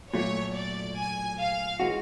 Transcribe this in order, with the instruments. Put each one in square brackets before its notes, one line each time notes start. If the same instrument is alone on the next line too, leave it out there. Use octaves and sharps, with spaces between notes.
[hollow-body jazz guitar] A#2 F#3 A3 [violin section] C#5
[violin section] D5
G#5
F5
[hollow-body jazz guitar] E3 G#3 C#4 F#4